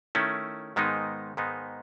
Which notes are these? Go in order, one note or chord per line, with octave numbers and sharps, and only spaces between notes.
D#3 A3 C#4 E4
G#2 D#3 G#3 B3 D#4
G#2 D#3 G#3 B3 D#4